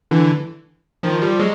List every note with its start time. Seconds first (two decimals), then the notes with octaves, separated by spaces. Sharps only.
0.11 D3 E3
1.03 D#3 F3
1.22 F3 G3
1.39 F#3 G#3